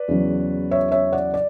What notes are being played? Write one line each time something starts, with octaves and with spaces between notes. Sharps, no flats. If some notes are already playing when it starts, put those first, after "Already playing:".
Already playing: B4 D5
E2 C#3 F#3
C#5 E5
C#5 E5
D5 F#5
D5